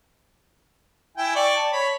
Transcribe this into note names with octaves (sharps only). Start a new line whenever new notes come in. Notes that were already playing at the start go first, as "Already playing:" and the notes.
E4 G5 G#5
D5 G5 C#6
A5
C#5 B5